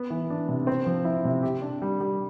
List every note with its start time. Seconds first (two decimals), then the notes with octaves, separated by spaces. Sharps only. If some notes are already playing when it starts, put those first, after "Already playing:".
Already playing: B3
0.10 E3
0.30 D4
0.49 C3
0.67 C4
0.86 F3
1.05 E4
1.25 C3
1.43 G4
1.62 D4
1.82 G3
2.00 G3